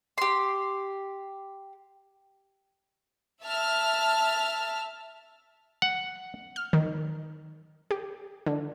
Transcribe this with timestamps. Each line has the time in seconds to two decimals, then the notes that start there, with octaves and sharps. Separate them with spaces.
0.18 G4 C6
3.43 E5 A5 F6
5.82 F#5
6.56 F6
6.73 D#3
7.91 G4
8.46 D3